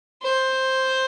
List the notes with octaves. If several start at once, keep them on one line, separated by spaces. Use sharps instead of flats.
C5